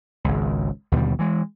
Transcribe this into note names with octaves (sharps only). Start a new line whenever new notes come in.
G#1 C#2
D#2 B2 D3 G3
E3 G#3